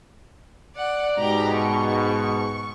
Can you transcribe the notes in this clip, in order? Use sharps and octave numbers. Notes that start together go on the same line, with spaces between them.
D5 F#5
G#2 B2 G4 A#5
C#6